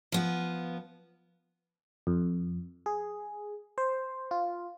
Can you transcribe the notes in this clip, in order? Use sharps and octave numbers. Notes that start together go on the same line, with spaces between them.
F3 B3
F2
G#4
C5
F4